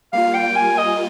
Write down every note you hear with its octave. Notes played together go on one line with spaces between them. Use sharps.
G3 A#3 F4 F5
G5
G#5
D#5